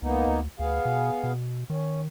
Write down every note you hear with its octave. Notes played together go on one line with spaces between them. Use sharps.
C#2 A#3 B3 D#4
D2
D2 B3 G#4 F5
B2
B2
D#3 C#4